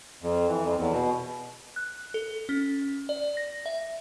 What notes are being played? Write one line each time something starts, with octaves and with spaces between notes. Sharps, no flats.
F2
E3
F2
E2
B2
F#6
A4
C#4
D5
A#6
E5